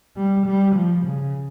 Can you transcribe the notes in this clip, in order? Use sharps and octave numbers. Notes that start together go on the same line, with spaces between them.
G3
G3
F3
C#3